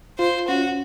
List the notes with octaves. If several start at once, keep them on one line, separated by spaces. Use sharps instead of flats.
F4 C5
C#4 F#4